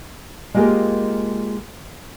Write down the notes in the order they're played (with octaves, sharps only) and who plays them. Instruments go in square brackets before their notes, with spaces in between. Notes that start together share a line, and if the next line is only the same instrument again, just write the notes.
[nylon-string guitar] G#3 A#3 F4 G4 G#4 A#4